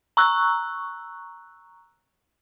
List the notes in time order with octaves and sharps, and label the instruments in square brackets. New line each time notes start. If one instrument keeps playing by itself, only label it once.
[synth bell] A#5 C#6 E6 F#6